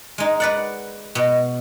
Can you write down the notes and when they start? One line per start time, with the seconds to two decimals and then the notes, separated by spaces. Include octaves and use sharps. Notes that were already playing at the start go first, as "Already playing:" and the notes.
0.18 G#3 D#4
0.40 B4 D5 F#5
1.15 B2